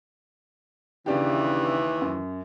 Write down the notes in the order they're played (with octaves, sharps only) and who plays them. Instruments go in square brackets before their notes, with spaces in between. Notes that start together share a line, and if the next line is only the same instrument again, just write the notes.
[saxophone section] D#2 E3 [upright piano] C#3 D4 G4
[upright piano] F#2